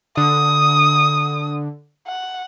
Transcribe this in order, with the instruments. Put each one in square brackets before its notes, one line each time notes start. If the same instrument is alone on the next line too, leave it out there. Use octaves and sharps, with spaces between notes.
[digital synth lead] D3 [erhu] D#6
[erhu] F#5